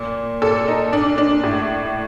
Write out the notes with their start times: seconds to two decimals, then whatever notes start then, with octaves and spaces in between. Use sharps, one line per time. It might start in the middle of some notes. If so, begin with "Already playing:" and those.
Already playing: A#2
0.42 A#2 A4
0.68 D#4
0.92 A#2 D4
1.18 D4
1.44 A2